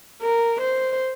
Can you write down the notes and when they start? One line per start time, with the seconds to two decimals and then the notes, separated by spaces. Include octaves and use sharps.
0.21 A#4
0.61 C5